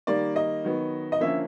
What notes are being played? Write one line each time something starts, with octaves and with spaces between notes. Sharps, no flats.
D#3 G3 A#3 D5
D#5
D#3 F#3 B3
D#5
D3 F3 A#3 C#4 E5